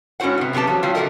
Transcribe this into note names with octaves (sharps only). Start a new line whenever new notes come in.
G#2 C#4 E4 F#4 C5 F#5
C3 B3
F#2 C3 B3 G4 A5
F3 F#3
A#2 F#3 G3 F4
A#2 D3 G3 A3 A#4 D#5